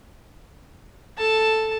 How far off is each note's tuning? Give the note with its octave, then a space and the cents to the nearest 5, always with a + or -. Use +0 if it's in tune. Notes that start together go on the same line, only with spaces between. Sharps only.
A4 +0 A5 +0